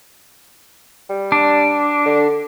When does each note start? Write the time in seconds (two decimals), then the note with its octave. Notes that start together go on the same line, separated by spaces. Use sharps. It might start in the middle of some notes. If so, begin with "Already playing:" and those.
1.10 G3
1.32 D4
2.06 D3